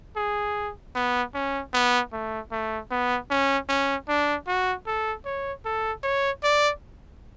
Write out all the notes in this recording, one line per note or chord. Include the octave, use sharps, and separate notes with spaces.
G#4
B3
C#4
B3
A3
A3
B3
C#4
C#4
D4
F#4
A4
C#5
A4
C#5
D5